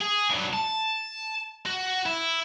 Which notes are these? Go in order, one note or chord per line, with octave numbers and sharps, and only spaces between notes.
G#4
G2 F#3
A5
F#4
E4